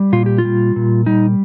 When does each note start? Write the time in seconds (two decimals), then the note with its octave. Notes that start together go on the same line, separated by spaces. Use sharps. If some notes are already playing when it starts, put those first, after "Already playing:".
Already playing: G3
0.13 A#2 F4
0.26 G4
0.38 F4
0.45 G3
0.76 A#2
1.06 G3 D#4